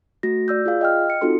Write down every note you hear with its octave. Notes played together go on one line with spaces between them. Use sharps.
A3 F#4 A#6
D5 E6 G6
F4 G#4 F5
D#5 G5 F6
C#7
C4 D#4 F4 F#4 A4 C6